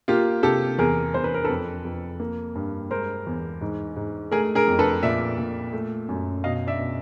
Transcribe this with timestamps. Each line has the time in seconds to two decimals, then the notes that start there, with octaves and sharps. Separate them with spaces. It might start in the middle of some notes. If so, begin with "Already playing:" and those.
0.08 A#3 F4 G4
0.43 C3 G4 A4
0.78 E2 G#4 A#4
1.14 E2 C5
1.24 B4
1.34 A#4
1.45 F2 A4 B4
1.85 F2
2.20 A#3
2.55 G2
2.91 G#3 A#4 C5
3.27 E2
3.61 G#2
3.96 G#2
4.31 A3 G#4 A#4
4.55 G#4 A#4
4.67 F2
4.79 A4 B4
5.03 A#2 D5 E5
5.38 A#2
5.73 A3
6.09 F#2
6.44 B2 D#5 F5
6.67 D5 E5
6.79 B2